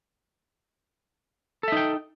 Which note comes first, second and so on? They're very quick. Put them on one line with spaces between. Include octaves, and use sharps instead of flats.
A4 E5 D#4 G5